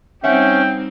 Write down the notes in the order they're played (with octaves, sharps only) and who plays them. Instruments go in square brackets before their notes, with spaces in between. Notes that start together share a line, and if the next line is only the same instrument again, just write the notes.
[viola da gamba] G3 C4 D#4 [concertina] C#4 [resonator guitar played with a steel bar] E5 F#5 [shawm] G5